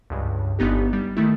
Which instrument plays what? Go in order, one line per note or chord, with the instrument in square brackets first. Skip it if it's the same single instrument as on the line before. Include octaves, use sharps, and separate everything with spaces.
[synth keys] C#2 G2
G1 B3 D#4 G4
G3
D#3 A3 E4